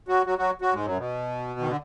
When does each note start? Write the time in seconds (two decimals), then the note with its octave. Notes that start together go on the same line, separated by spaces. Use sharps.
0.08 F#3 F#4
0.26 F#3 F#4
0.38 F#3 F#4
0.61 F#3 F#4
0.74 G#2 G#3
0.85 F#2 F#3
0.97 B2
1.60 D#3
1.67 D3